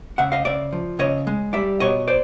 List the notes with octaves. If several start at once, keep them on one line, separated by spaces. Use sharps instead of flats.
C#3 E5 F#5
D#5 F5
C#3 D5 E5
F3
C#3 C#5 D#5
G#3
G3 D5 E5
B2 C#5 D#5
C5 D5